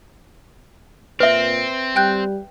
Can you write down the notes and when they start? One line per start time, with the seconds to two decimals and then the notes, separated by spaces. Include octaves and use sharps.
1.20 A#2 C4 B4 E5
1.96 G3 G5 F#6 G6